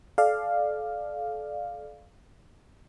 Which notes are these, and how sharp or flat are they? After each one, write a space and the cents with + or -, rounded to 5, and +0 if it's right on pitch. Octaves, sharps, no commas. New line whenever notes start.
A4 -35 D5 +15 F5 +0